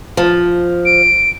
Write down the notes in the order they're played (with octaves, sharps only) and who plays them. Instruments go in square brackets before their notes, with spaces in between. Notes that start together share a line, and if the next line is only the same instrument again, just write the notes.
[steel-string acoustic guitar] F3
[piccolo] D7